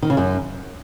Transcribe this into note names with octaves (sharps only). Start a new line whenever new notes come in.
D#3
C#3
F#2